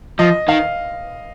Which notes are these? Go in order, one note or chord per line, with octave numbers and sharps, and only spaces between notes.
F3 D#5
D#3 F5